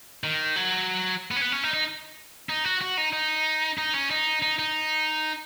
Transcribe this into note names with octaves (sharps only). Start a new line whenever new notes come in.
D#3
F#3
B3
C#4
B3
C#4
D#4
D#4
D#4
F#4
F#4
D#4
D#4
D#4
C#4
D#4
D#4
D#4